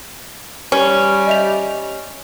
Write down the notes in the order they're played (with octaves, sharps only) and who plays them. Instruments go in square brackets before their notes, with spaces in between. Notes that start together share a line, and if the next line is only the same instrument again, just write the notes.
[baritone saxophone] G3 [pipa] C#4
[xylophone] D#5 E5 F7